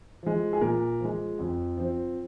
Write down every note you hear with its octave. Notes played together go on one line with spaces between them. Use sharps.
F3 G#3
G#4
A#2 A#4
F3 G#3
F2
F3 C4